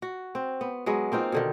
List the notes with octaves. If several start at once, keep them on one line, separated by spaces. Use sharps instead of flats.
F#4
C4
B3
F#3 G#3 B3
A#3 C4 D#4 F4
B2 D3 D#3